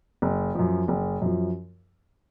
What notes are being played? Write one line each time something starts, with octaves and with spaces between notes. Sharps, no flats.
F#1
F#2 F3
F#1
F#2 F3